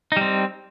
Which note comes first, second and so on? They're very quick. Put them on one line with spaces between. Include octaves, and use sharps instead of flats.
D#4 G3 C4